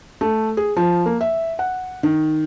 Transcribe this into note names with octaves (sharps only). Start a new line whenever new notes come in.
A3
G#4
F3
A#3
E5
F#5
D#3